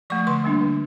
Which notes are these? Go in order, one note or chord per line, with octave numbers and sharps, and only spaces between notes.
F3 A3 C#6
D3 C6
G3 A#3 D4
D3